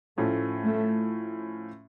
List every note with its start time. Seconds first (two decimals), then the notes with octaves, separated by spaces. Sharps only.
0.17 A2 F3 A3 C#4
0.64 A3